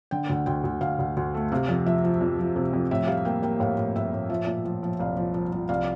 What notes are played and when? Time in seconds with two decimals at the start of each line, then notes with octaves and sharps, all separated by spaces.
0.11 D3 G5
0.30 D2
0.46 D2 G5
0.64 D2
0.81 D2 F5
0.99 D2
1.17 D2
1.34 A3
1.52 C3 F5
1.69 F2
1.85 F3 E5
2.04 F3
2.21 F2
2.39 F3
2.56 C3
2.73 F2
2.91 A2 E5
3.07 G3 F5
3.25 A#3 G5
3.42 A#3 G5
3.60 A2 F5
3.77 A2
3.96 A2 E5
4.12 A2
4.29 F3 E5
4.47 A#2
4.65 F3
4.83 F3
4.99 C2 F5
5.17 F3
5.34 F3
5.53 F3
5.69 C2 F5